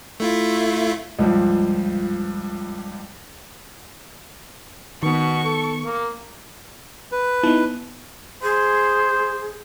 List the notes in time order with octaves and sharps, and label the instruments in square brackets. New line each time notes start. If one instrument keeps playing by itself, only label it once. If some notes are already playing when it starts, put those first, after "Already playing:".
[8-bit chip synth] A3 E4 F4
[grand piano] C#2 G2 F3
[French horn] B2 [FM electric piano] D#3 B3 [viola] C#6
[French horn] A4
A#3
[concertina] B4
[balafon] B3 [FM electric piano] D#4 E4
[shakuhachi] G#4 [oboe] C5